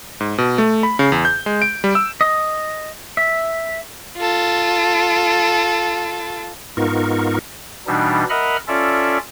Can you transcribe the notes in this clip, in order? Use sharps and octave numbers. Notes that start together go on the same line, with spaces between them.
G#2
B2
A3
B5
C#3
E2
G6
G#3
D7
G3
E6
D#5
E5
F4 A4
G#2 B3 D#4 F4 A#4 C#6
B2 E3 G3 D4 D#4
A#4 D#5 E5 F#5 B5 F6
C#4 F4 A4 D5 E5